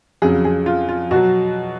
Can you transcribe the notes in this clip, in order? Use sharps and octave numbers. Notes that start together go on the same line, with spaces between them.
F2 C#3 F#3 G#4
G#4
F4
F4
B2 F#4
F#3